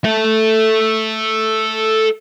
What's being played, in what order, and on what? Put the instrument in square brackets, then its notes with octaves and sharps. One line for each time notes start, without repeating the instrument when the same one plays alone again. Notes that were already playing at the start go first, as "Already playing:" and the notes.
[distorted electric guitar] A4 E5